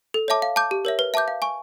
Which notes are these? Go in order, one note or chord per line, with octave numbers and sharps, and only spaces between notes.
A4
C#5 E5 A5 D6
F5
A5 D6 G6
G4
A#4 C#5 E5
B4
E5 A5 D6 G6
F5
G#5 C#6